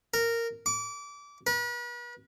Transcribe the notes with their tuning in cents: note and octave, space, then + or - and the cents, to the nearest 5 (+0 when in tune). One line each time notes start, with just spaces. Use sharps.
A#4 -10
D6 -25
B4 -40